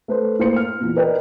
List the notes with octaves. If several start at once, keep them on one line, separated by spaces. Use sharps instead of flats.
A3 B4 C5
A2 A#3 C5 C#7
F6
E2 A#2
A#4 B4 D5 D#5 G5